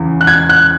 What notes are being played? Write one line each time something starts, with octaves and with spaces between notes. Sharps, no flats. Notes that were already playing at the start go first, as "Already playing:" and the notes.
Already playing: E2 C#3 E3
F#6
G#6
F#6